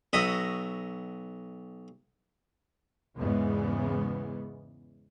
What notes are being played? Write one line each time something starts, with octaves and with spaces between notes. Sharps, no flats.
B1 F#4 D#5 E5 D#6
E2 G#2 C#3 E3 G#3 B3